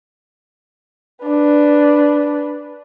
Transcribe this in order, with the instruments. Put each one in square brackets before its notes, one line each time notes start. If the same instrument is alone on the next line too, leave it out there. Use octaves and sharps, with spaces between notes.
[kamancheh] D4 B4